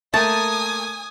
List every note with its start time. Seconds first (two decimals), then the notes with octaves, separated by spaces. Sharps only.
0.14 A3 A#3 G#5 A5 D#6